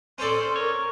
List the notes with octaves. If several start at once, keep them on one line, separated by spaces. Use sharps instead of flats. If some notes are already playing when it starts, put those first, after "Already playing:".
C#4 A4 C5 D5
A#4 C#5